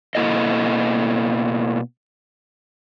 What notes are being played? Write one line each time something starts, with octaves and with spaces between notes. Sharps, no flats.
B2 A#3 E4 A4 D#5